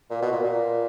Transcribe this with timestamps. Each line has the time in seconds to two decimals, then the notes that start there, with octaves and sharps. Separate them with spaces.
0.10 A#2
0.22 B2
0.32 A#2
0.43 A#2